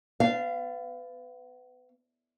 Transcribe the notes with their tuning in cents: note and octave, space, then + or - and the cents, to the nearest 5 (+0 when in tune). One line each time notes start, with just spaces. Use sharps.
B3 +30 F5 -20